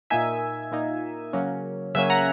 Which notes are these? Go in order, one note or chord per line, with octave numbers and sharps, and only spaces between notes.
A#2 A#3 D#4 E5 G#5
A#2 A#3 D#4
C#3 F#3 A#3 C#4
C#3 F#3 A#3 C#4 E5 G#5
F#5 A#5